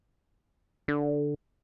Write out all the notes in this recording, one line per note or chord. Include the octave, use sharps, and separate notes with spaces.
D3